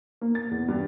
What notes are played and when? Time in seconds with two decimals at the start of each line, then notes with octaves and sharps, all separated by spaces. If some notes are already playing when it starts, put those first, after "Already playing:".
0.21 A#3
0.35 A6
0.51 E2
0.68 G2